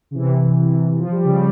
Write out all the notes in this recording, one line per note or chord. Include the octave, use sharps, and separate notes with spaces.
C#3
C3 E3
F3
G3
C#3 F3
G3